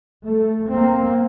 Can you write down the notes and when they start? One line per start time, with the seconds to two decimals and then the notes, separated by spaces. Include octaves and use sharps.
0.24 A3
0.67 A#3 C4